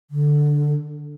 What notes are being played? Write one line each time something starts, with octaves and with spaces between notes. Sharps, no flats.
D3